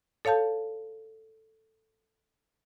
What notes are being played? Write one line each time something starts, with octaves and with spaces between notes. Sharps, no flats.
A4 C#5 F5 A5 G6